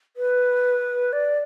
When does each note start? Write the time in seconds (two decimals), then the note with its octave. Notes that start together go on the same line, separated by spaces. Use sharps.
0.16 B4
1.12 D5